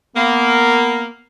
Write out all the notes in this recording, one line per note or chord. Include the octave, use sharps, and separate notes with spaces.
A#3 B3